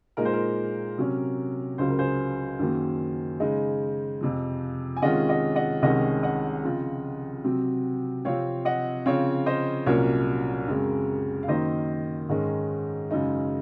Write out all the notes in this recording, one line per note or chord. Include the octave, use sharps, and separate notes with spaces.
A#2 G#3 D#4 A#4
C5
A#4
C3 F#3 C#4
C#2 C#3 F#3 C5
A#4
G#4 C5
F#2 D#3 F#3 A#3
C#3 G#3 D#4
F2 C3 F3
G#5
C3 D#3 G#3 C#4 F4 D#5 F#5
D#5 F#5
D#5 F#5
C2 C3 D#3 G#3 C#4 D#5 F#5
D#5 F#5
C#3 F3 C4 F4
C3 F#3 C4
C3 F3 C4 C#5 F5
D#5 F#5
C#3 F3 C4 C#5 F5
C5 D#5
C2 A#2 F#3 C#4 A#4 C#5
F#2 C#3 G#3 C4
F5
F#2 D#3 A#3 D#4 C5 D#5
G#2 D#3 G#3 C#4
F#2 C#3 G#3 D#4